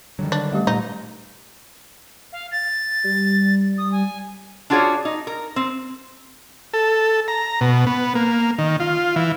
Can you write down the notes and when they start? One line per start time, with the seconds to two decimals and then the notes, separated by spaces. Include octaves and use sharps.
0.19 D3 D#3 F#3 G3
0.32 D4
0.52 G3 A3 G4
0.67 A#2 D#4
2.33 F5
2.52 A6
3.04 G3
3.78 D#6
3.92 G#5
4.70 D4 F4 F#4 G#4 C#5 D5
5.05 D#4
5.27 A#4
5.56 C4
6.74 A4
7.28 A#5
7.61 B2
7.87 B3
8.15 A#3
8.58 D#3
8.80 F4
9.16 E3